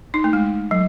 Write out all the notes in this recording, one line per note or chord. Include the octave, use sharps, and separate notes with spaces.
D#4
A3
G#3
F#3